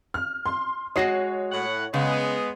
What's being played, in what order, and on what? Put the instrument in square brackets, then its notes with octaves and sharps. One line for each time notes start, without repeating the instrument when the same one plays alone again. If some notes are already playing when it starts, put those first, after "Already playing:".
[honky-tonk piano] F6
C6
[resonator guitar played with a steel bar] G#3 F#4 D#5 [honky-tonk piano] C#5 C7
[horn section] A2 F#5
[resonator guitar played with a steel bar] C#3 [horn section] G#3 B3